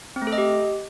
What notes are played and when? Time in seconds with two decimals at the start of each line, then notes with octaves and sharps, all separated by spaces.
0.16 C4
0.22 A3
0.27 A4
0.32 D#5
0.38 G4